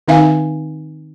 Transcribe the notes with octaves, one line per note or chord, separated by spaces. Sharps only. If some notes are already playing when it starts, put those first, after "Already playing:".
D#3 C4 D#4 E5 F5 G#5